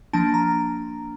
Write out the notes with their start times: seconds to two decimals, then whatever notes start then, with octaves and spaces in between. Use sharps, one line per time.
0.13 F3 A#3 D4 A5
0.34 A#5